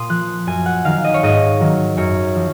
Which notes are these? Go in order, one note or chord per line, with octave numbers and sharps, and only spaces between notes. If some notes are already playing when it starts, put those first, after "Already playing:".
Already playing: A#2 C6 D#6
F3 F#6
F#2 G#5
F#5
D#3 F#3 F5
D#5
C#5
G#2 D#5
D#3 F#3
F#2 C#5
F3